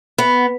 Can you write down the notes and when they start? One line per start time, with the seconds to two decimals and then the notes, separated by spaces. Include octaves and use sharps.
0.18 B3